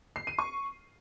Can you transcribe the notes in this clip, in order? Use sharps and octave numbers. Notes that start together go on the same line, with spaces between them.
C7
D#7
C#6